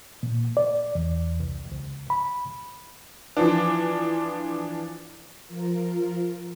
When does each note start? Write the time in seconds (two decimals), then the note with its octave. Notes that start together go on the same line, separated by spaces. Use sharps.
0.23 A#2
0.57 D5
0.95 E2
1.40 C2
1.72 C#2
2.10 B5
3.37 E3 F3 D4
5.46 F3 F4 A#4